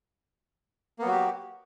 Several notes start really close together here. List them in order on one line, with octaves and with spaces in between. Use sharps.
A#3 B3 F#3 F#4 G4